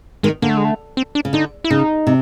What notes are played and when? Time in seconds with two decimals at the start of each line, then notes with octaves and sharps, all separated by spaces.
0.23 D#3 G#3
0.42 D3 A#3
0.49 A3
0.57 G#3
0.65 A3
0.97 C4
1.15 D4
1.25 C#3
1.33 D3 D#4
1.64 E4
1.70 C#3 D#4
2.07 C3